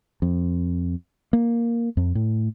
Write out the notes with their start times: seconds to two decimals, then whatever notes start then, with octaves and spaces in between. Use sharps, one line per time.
0.22 F2
1.33 A#3
1.97 F2
2.15 A2